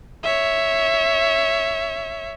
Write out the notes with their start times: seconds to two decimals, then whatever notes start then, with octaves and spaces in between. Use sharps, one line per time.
0.24 C#5 E5